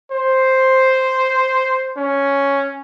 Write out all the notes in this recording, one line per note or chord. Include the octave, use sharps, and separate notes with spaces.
C5
C#4